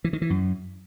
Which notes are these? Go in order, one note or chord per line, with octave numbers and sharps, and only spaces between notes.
E3
D#3
E3
F#2